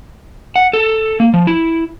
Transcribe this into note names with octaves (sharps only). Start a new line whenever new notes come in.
F#5
A4
A#3
F3
E4